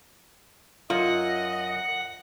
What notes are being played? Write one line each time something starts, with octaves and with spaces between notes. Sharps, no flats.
F#2 F4 D#5 F#5